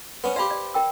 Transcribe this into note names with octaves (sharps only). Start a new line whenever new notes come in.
B3 C#4 B4 C5
G4 C5 D5 F5 B5
D5
A#4 G5 E6